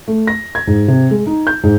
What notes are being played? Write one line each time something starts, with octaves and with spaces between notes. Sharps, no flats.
A3
A#6
G#6
G#2
C3
G#3
D#4
G6
G#2